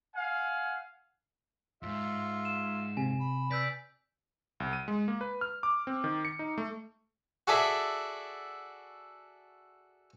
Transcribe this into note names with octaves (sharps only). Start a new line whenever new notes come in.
F5 F#5 G#5
E2 G#2 F4 E5
E7
C3 G#5
B5
B4 D5 E6 G6 B6
C2
D#7
G#3
A#3
B4
F6
D6
C4
D#3
C#7
D#4
A3
F#4 G#4 A4 D5 E5